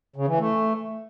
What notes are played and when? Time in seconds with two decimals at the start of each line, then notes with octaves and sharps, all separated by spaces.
0.16 C#3
0.28 E3
0.39 A3